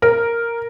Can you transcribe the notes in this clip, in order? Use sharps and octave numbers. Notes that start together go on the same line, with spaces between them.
A#4